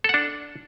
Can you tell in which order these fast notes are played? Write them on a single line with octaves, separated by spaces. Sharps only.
A4 F#5 D4